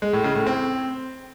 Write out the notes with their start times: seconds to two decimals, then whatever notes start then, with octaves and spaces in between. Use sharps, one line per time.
0.02 G#3
0.13 A2
0.24 C#3
0.35 A2
0.46 C4